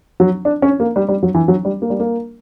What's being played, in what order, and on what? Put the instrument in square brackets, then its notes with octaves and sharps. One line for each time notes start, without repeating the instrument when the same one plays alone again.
[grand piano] F#3
D4
C#4
A#3
G3
G3
F#3
E3
F#3
G3
A#3
G3
A#3